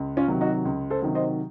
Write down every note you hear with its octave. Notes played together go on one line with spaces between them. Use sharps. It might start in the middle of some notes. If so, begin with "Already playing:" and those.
Already playing: C#2
C#4 F4
C3 D#3 F#3
D#4 F#4
C#2
A4 C5
C3 D#3 F#3
C5 D#5